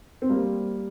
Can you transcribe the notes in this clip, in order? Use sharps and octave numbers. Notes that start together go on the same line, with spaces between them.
C4
G3 A#3